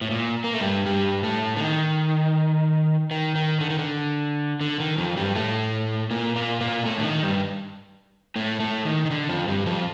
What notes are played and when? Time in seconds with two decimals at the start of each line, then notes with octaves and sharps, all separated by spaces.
0.01 A2
0.11 A#2
0.44 A#3
0.53 A3
0.61 G2 G3
0.86 G2 G3
1.23 A2 A3
1.57 D3
1.61 D#3
3.11 D#3
3.35 D#3
3.61 D3
3.70 D#3
3.79 D3
4.61 D3
4.80 D#3
4.98 F2 F3
5.17 G2 G3
5.35 A2 A3
6.10 A#2 A#3
6.35 A#2 A#3
6.61 A#2 A#3
6.85 A2 A3
6.99 D3
7.04 D#3
7.23 G2 G3
8.36 A2 A3
8.60 A2 A3
8.85 D#3
9.06 D#3
9.11 D3
9.29 F2 F3
9.48 G2 G3
9.66 F2 F3